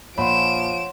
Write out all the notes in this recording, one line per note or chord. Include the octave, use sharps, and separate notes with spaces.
A#1 F3 C#5 F#5 B5 C6 D7 E7